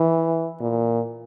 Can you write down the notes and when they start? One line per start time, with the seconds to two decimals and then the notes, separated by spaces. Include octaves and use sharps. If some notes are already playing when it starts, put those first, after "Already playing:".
Already playing: E3
0.60 A#2